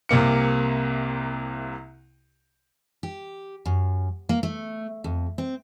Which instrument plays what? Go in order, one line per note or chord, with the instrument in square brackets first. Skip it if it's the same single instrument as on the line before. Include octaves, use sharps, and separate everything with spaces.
[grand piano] C2 C3 A#3 C#7
[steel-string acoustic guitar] G4
F#2
A#3
A3
F2
C4